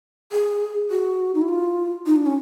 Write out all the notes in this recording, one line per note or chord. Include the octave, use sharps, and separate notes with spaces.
G#4
F#4
D#4
E4
F4
D#4
D4
C#4